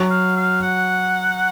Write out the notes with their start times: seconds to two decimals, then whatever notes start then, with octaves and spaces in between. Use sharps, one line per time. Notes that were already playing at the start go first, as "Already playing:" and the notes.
Already playing: F#3 F#4
0.10 F5
0.37 F5
0.62 F#5